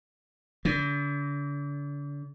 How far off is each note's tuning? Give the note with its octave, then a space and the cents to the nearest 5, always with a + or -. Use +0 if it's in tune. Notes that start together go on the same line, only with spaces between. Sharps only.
D3 -40